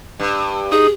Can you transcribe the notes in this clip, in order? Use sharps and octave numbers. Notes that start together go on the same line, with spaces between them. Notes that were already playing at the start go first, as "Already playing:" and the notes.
G2
D#4 G#4